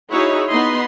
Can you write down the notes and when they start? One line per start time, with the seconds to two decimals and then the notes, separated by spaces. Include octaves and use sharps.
0.11 D#4 E4 F#4 G#4 C#5
0.51 B3 D#4 D#5 B5 C6